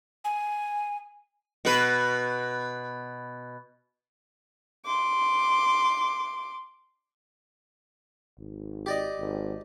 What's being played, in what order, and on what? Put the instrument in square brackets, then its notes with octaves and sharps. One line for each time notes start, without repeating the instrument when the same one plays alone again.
[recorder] G#5
[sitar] B2 B4
[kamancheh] C6 D6
[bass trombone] G#1
[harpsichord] G4 D5 D#5
[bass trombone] G#1